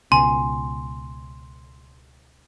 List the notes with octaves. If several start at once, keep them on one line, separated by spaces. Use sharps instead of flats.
C#2 B2 G#5 C6